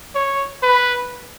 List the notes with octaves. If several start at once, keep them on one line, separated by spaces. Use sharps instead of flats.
C#5
B4